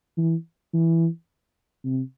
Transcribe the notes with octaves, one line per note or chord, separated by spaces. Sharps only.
E3
E3
C3